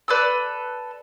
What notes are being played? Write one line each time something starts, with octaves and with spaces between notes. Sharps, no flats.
A4 B4 D5 E6